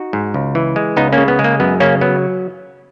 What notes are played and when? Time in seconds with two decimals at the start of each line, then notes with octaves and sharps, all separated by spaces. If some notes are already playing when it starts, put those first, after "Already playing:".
Already playing: D#4 F#4
0.13 G#2
0.34 C#2
0.55 E3
0.76 G#3
0.97 C#2 B3 D#4
1.13 A#3 C#4
1.18 C#3
1.28 B3
1.39 G#3
1.44 A#3
1.60 F#2 B3
1.80 C#3 A#3 C#4
2.01 F#3 B3